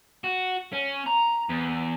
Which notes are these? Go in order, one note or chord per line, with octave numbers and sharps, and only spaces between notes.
F#4
C#4
A#5
E2